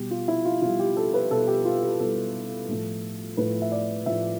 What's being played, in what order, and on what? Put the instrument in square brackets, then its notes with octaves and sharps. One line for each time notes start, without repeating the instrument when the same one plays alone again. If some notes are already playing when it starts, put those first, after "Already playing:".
Already playing: [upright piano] B2 G3 G4
F4
E4
F4
B2 G3 F4
G4
A4
B4
B2 G3 A4
G4
F4
G4
B2 G3 A4
A2 F3 A3
A2 F3 A3 B4
E5
D5
A2 F3 A3 E5